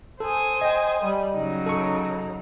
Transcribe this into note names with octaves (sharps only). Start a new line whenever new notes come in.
A4 C5 G#5 D#6
D#5 G5
G3
C#3 F#3 D#4
A4 C#6